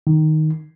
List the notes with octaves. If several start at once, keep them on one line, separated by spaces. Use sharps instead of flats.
D#3